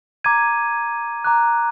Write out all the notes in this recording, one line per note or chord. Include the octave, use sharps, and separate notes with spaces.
A#5 D6 G#6 D#7
A#5 D6 F#6